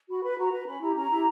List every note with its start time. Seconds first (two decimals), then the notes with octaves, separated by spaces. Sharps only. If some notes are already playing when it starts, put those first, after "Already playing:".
0.10 F#4 B5
0.23 B4 B5
0.39 F#4 A#5
0.53 B4
0.67 C#4 B5
0.81 E4 G4 A#5
0.96 C#4 A#5
1.10 E4 G4